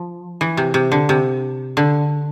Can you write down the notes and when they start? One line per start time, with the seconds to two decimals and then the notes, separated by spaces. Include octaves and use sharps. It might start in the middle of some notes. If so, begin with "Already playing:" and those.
Already playing: F3
0.41 E3
0.57 C3
0.74 C3
0.92 D3
1.09 C3
1.77 D3